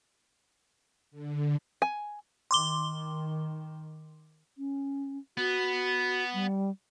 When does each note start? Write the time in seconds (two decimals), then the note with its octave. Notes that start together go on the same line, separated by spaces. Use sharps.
1.11 D3
1.82 G#5
2.51 D#3 C6 D6 G7
4.58 C#4
5.37 B3 F#4
6.33 G3